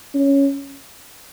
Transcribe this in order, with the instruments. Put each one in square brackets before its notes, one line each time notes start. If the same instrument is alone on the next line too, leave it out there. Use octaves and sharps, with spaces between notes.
[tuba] C#4